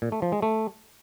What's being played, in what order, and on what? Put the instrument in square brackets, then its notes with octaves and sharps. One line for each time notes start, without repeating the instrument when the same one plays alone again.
[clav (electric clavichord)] A#2
A3
F3
G#3
A3